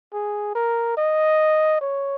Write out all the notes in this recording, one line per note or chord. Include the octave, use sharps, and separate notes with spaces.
G#4
A#4
D#5
C#5